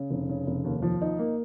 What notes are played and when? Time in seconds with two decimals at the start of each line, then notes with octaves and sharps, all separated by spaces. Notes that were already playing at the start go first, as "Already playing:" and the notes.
Already playing: C#3
0.11 F1
0.29 C#3
0.47 F1
0.64 D#2
0.82 F3
1.01 D#4
1.19 A#3